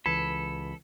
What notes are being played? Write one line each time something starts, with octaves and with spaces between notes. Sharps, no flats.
C#2 E3 A4 B4 B5 G#6